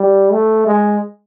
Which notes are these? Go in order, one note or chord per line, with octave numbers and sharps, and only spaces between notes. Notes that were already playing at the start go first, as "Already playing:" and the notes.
Already playing: G3
A3
G#3